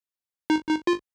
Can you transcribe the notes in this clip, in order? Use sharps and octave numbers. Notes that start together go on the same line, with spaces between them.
D#4
D#4
F4